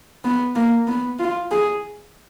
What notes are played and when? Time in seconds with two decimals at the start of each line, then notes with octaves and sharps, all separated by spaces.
0.25 B3
0.56 A#3
0.87 B3
1.20 F4
1.51 G#4